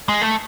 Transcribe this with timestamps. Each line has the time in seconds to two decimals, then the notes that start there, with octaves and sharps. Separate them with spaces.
0.09 G#3
0.22 A3